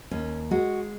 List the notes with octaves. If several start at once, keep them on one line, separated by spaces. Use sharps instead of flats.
D#2 C#4
G#3 F#4